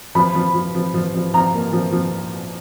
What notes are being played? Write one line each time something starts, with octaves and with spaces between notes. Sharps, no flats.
F3 B5
F3
F3
F3
F3
F3
F3 A#5
A#3
F3
F3